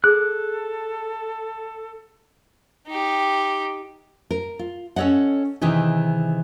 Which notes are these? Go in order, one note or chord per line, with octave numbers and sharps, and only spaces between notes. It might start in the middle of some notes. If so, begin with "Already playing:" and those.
G#4 A4 F#6
D#4 G4
A#4
F4
C#4 A4 C#5 D#5 F#5
C3 D#3 E3 D#4 G#4